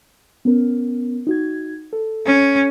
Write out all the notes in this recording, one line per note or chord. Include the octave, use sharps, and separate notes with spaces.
B3 C#4 A#4
D#4 F#4 G#6
A4
C#4